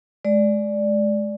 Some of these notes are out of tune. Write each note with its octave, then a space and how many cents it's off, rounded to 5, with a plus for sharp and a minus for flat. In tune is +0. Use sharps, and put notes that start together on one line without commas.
G#3 +30 D5 +0